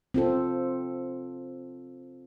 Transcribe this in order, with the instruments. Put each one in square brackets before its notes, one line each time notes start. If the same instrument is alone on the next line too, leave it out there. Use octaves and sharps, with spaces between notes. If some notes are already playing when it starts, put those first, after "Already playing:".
[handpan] C4 F4 A4